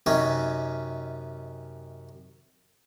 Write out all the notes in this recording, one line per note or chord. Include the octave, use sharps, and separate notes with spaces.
F#2 C3 C#4 D#4